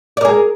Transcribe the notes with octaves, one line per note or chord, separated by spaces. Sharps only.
G#4 A#4 D5